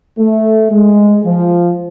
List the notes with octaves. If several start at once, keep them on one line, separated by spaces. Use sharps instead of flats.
A3
G#3
F3